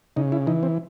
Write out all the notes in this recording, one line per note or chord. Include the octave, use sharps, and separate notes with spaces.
C#3 D#4
E4
E3 D#4
C4